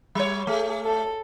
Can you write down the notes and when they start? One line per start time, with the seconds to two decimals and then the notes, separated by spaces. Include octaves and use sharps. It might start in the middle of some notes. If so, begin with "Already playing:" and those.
0.15 G3 C#5
0.47 A3 G#4
0.84 A4